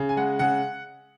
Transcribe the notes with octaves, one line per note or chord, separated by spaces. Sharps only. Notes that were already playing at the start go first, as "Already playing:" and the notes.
Already playing: C#3
G#5
G#3 F#5
C#3 F#5